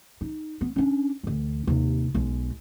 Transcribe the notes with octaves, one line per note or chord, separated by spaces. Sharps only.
D#4
B3
C#4 D4
D2 E3
D#2 C3
B1 G#3